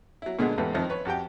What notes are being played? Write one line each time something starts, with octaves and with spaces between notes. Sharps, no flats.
F#3 E4
A#2 D3 G#3 B3 D4 G#4
E2 G#2 G4 A4 B4
F2 D#3 F3 C4 D#5 E5
B4 C#5
F2 F#4 G4 G5